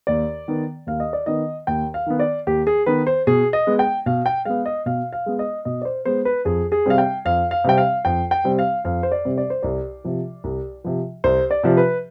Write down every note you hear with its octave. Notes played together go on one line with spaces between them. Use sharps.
D#2 D5
D#3 B3
D#2 F5
D#5
D5
D#3 B3 D#5
D#2 G5
F5
D#3 B3
D5
D#2 G4
G#4
D#3 B3 B4
C5
B2 G#4
D#5
G#3 B3
G5
B2 F5
G5
G#3 B3 F5
D#5
B2 F5
F5
G#3 B3
D#5
B2 D#5
D5
C5
G#3 B3 C5
B4
F2 G#4
G#4
C3 G3 C4 F5
G5
F2 F5
F5
C3 G3 C4 G5
F5
F2 G5
G5
C3 G3 C4
F5
F2 F5
C5
D5
C3 G3 C4
D5
C5
C2 D5
C3 F3
C2
C3 F3
C2 C5
D5
C3 F3
B4